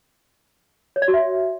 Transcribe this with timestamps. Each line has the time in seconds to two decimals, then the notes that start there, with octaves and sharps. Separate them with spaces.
0.96 C#5
1.02 D5
1.08 F#4
1.14 E5